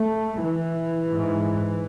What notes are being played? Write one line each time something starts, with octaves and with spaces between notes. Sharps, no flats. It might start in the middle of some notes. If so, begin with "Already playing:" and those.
Already playing: A3
E3
G#2